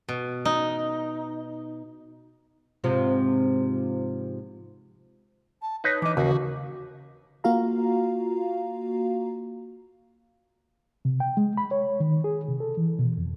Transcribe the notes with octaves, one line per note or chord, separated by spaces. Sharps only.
B2
D#4
G#2 C3 F3
A5
D#4 B4 C#5
E3 D#5 D6
D#2 C#3 F#4
A#3 F4 F#4 F5 A#5
C3
G5
G#3
B5
C#5
D#3
G#4
C3
A4
E3
B2
F2